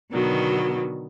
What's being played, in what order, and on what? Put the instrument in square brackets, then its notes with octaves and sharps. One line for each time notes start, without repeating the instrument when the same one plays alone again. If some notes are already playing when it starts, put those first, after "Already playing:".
[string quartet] B2 D3 D#3 F#3 B3